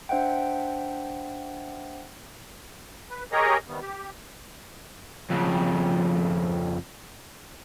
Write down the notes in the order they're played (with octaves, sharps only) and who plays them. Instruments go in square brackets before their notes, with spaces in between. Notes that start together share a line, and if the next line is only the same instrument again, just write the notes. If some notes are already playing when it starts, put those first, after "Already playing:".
[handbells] D4 C5 E5 F#5 G5
[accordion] B4
G4 G#4 A#4 C#5 D#5 A#5
C3 D#3 G3 B3
G4
[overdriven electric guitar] F2 C#3